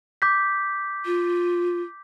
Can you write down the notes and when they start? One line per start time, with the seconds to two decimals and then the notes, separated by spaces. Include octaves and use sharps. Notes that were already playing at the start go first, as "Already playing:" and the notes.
0.22 D6 G6 B6
1.05 F4